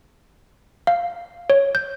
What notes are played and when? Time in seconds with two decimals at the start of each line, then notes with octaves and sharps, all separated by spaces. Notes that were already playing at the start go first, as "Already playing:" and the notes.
0.87 F5
1.50 C#5
1.75 G6